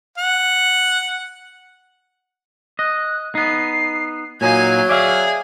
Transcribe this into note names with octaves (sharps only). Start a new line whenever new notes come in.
F#5
D#5 F#6
B3 D#4 C7
A#2 F#3 D#4 F5 G#5 G#6
G#4 D5 E5 F5